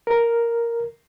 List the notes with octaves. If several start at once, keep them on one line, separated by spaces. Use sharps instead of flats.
A#4